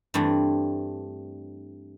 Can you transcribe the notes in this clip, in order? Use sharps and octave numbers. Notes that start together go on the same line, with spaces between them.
G2 E3 A3 C4 D4